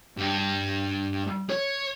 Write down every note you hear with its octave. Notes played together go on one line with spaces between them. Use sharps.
G2
C#5